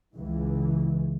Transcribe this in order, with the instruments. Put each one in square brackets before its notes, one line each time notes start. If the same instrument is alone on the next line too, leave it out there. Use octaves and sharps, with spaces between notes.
[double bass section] C#2 E3